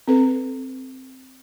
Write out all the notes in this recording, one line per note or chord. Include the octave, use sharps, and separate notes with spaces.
C4 A4 B4